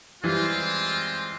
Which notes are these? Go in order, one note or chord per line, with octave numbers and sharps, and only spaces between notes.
E3 G3 G#3 C4 F4